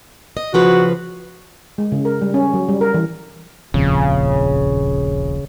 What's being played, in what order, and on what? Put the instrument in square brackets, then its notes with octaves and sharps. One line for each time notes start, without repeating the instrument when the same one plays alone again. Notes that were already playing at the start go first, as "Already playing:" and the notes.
[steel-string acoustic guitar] D#5
[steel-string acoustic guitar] C#3 F3 B4 [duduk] F#4
[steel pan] G#3
C#3
A#4
G3
C#4
F#3
G3
A#4
E3
[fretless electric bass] D#1 A#1 F2 [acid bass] C#3